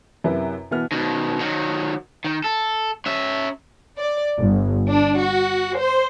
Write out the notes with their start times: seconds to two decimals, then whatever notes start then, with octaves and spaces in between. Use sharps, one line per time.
0.24 F#2 C3 E4 A#4 B4
0.71 B2 E3 B3 F6
0.92 B2 D#3
1.40 D#3 F#3
2.25 D#3
2.44 A4
3.06 C#4 E5
3.97 D5
4.38 G1
4.87 D4
5.20 F#4
5.77 C5